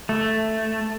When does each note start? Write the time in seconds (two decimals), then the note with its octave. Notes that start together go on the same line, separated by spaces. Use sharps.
0.09 A3